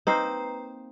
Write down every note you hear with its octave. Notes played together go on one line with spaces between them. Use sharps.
A#3 C4 D#4 B4 A#5 C7